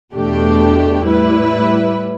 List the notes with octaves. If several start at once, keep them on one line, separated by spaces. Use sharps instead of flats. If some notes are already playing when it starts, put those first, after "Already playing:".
E2 B2 A3 D4 G4
A2 G3 E4 B4